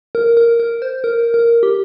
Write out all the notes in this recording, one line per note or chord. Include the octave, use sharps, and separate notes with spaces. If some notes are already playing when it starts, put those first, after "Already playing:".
A#4
A#4
A#4
C5
A#4
A#4
G4